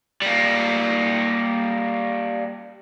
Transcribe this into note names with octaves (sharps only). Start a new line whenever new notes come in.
G3 A#3